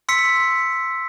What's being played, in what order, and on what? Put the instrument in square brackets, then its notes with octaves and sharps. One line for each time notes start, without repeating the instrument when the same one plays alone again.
[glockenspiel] C6 E6 B6 C#7